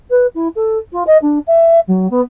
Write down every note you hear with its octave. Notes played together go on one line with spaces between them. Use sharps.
B4
E4
A4
F4
D#5
D4
E5
F#3
B3